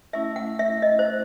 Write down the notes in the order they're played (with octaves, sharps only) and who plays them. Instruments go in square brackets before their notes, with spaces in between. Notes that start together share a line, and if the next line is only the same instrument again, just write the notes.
[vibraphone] A3 C#4 E4 [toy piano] E5
[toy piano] F#5
E5
D#5
C5